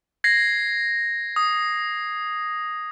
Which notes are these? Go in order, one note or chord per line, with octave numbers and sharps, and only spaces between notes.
G#6 A#6 C7
D#6